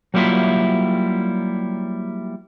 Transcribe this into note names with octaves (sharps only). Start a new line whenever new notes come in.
F#3 G3 A#3 E4 F4 E5